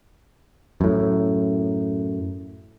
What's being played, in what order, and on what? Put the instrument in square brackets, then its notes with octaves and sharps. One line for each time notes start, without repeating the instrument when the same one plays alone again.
[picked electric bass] F#2 A2